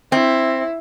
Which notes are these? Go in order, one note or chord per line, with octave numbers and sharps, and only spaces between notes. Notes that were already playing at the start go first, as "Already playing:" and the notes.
C4 E4